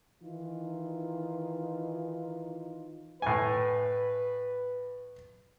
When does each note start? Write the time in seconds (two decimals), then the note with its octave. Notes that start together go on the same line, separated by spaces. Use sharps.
0.22 D#3 E3 D#4 F4
3.22 A2 B4 G#5